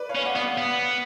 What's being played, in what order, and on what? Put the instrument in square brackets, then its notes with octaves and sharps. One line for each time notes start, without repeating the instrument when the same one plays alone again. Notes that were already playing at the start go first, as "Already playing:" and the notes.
Already playing: [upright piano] B4 D5
C#5 F5
[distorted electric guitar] C#4
[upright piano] D5 F#5
[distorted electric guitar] B3 [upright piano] F5
[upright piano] D5 F#5
[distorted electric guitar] B3